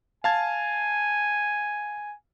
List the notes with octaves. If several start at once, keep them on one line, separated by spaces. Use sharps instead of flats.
F5 G#5 A5 G#6